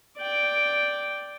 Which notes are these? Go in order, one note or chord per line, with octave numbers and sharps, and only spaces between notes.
D5 G5